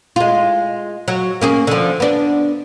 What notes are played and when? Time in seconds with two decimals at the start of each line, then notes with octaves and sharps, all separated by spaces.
0.16 G#3 F4
1.08 F#3
1.41 A#3 C#4 G#4
1.67 D3 F3
2.00 B3 D4